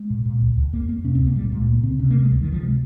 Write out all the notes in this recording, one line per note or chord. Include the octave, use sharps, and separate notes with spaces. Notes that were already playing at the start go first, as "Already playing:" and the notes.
Already playing: G#3
A#2
A#2
C#2
C#2
F2 A#3
F2 A#3
C3 C#4
C4
C#2
A#3
A#2 G3
A#2 G#3
C#2 A#3
C#3 C4
C3 C#4
A#3
C3
G#3
C#2 G3
D#3
C#2
F3
C3 G#3